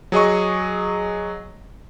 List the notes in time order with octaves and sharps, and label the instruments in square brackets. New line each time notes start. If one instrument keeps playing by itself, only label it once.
[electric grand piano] F#3 G#4 D#5 C#6